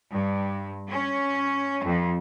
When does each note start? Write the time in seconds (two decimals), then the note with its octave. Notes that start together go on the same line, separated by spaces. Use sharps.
0.12 G2
0.89 C#4
1.84 F2